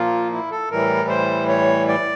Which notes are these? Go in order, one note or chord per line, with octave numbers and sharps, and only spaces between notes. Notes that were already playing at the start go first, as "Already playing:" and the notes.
Already playing: A#2 F3 A#3 F4
E4
A4
A2 E3 G3 A#4
C5
C#5
D5